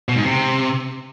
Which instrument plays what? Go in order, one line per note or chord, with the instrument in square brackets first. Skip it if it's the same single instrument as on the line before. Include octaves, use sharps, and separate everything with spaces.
[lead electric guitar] B2
G#2
C3